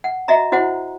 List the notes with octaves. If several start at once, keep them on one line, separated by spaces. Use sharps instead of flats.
F#5
F#4 D#5 E5 A#5
E4 F#4 C5 F#5